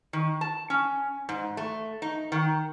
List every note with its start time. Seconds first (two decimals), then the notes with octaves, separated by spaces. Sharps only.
0.13 D#3
0.41 A5
0.70 C#4
1.29 G#2
1.57 A3
2.02 D#4
2.32 D#3